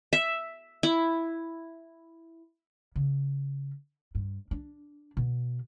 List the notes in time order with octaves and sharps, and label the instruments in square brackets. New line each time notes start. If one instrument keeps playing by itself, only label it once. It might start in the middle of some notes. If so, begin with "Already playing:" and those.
[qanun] E5
E4
[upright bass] C#3
G2
D4
B2